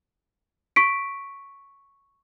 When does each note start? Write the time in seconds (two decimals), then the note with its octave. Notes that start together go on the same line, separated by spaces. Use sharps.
0.76 C#6 B6 D7